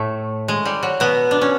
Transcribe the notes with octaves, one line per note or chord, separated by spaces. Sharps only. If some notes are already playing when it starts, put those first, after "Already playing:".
Already playing: A2 A3
G#3
G3
F#3
B2 B3
D4
C#4